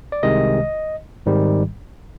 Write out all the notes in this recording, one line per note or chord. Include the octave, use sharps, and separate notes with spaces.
D5
C2 C3 D#3 G#3 D#5
G#1 G#2 D#3 G3